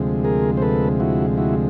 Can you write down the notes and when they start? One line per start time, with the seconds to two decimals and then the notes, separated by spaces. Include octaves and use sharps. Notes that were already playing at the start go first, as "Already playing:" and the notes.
Already playing: D2 C3 F3 G#3
0.24 G#4 A#4
0.57 C5
0.62 A4 B4
1.00 E4 F#4
1.37 E4 F#4